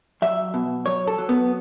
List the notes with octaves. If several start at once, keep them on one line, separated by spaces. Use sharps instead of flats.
F#3 E5
B2
F#3 C#5
A4
F#3
B3